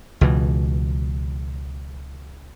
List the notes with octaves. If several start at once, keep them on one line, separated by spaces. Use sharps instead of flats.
C#2 B2 E3